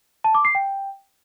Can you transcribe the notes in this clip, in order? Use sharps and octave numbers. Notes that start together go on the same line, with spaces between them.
A5
D6
C7
G5